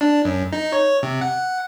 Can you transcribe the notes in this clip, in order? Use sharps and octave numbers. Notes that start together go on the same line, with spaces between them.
D4
F#2
D#4
C#5
C3
F#5